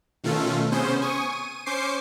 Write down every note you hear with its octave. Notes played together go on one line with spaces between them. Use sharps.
B2 D#3 A3 C#4 F4 A4
C3 B3 C#4 G#4 C5
G#5 C#6 D#6
D#7
C#4 C5 C#6 D6 C7